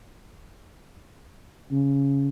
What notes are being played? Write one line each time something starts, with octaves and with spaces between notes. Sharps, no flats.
C#3